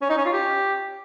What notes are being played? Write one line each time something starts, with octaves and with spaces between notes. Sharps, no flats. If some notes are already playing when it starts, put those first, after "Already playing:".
C#4
D#4
C#4
F4
G4